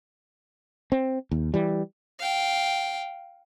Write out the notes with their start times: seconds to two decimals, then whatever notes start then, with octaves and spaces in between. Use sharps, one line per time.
0.92 C4
1.32 D#2
1.54 E3 G3
2.19 F5 G5